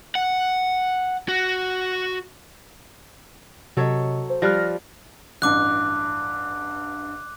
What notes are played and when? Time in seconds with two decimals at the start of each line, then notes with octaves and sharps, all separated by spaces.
0.15 F#5
1.28 F#4
3.77 C3 F#3 A4 C#5 D#5
4.30 C5
4.42 F3 G3 F6 F#6 A#6
5.42 A1 G2 D6 F#6